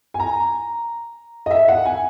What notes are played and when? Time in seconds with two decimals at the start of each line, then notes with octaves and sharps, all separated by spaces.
0.14 G#5
0.20 A#5
1.46 D#5
1.51 E5
1.68 F#5
1.86 G#5